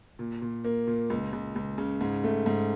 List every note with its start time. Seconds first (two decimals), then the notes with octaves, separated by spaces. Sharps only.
0.19 A#2
0.42 A#2
0.64 A#3
0.87 A#2
1.10 C#2
1.33 C#2
1.56 C#2
1.78 C#3
2.01 G#2
2.24 A3
2.46 G#2